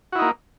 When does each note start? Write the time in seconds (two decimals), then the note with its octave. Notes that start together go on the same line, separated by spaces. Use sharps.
0.12 F#4
0.16 E4
0.19 D#4
0.22 A#3